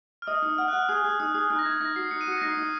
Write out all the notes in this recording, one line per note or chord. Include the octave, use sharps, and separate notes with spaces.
F6
D#5 D#6
D#4
F#5 F6
F#6
F#5
F6
G#4 D#6
G#4
D#4 D#6
G#4 D#6
D#4 F#6
A#6
D#4 G#6
D#4 A#6
F#4 C7
D#4 C#7
D#7
F#4
C#7
A#6
D#4 C7
D#4